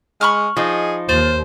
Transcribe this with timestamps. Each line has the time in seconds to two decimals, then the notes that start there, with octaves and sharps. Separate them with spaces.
0.21 G#3 B5 C#6 F6
0.57 F3 D#4 G#4
1.09 D#2 F4 C5